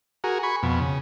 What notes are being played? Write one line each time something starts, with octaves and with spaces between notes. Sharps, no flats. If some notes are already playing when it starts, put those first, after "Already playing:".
F#4 G#4 A#4
G#5 B5 C#6
F2 B2
C#3